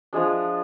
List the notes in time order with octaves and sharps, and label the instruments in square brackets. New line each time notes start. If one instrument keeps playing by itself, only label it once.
[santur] F3 G#3 D4